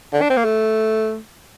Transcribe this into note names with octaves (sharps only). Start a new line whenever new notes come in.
D3
D4
C4
A#3
A3